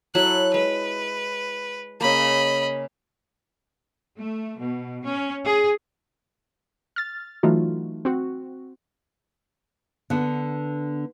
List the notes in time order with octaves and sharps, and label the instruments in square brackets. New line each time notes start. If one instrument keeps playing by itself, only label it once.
[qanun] F#3 E4 A4 [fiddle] F#6
[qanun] G#3 [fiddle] B4
[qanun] C#3 A#3 [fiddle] D#5 B5
[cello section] A3
B2
C#4
G#4
[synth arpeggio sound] F6 A6
E3 F#3 A3 D#4 F4 F#4
C4 F#4
[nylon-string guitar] D3 B3 D4